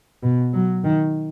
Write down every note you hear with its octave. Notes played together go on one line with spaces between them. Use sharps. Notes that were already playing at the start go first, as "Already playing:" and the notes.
B2
F#3
D#3